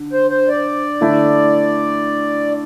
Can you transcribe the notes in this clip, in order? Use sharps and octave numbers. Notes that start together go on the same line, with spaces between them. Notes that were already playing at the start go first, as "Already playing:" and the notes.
Already playing: D3
C5
C5
D5
D3 A3 E4